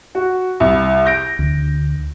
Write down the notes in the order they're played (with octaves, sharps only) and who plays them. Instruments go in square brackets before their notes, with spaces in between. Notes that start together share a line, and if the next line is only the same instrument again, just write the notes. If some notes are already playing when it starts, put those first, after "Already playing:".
[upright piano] F#4
C2
G6 A#6 D7
[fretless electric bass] D2